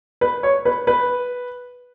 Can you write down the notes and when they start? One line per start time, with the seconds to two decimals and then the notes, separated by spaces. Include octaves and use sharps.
0.21 B4
0.43 C#5
0.65 B4
0.87 B4